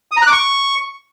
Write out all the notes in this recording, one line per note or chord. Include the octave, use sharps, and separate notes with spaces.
D#6
A#5
F#6
D6
C#6